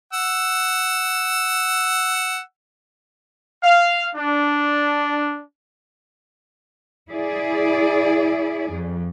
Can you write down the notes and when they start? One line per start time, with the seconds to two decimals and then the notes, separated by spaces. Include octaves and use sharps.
0.13 F#5 E6
3.62 F5
4.15 D4
7.10 E4 G#4 D5
8.71 F2